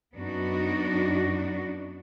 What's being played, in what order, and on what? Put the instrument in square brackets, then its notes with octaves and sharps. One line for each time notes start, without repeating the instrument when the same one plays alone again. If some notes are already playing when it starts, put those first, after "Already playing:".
[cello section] F#2 B3 D4 D#4 F#4